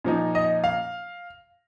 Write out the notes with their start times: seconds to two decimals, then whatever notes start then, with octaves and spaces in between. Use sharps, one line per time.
0.04 A#2 F3 D#4
0.35 D#5
0.64 F5